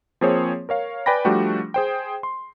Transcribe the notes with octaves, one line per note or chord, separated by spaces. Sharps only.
F3 A#3 C4 G#4 C5 C#5
A#4 C#5 F5
B4 D5 G5 G#5 B5 A#6
F3 G3 A3 D4 F#4 G4
G#4 C5 G5
C6